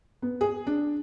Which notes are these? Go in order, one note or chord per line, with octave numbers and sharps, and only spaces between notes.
B3
G#4
D4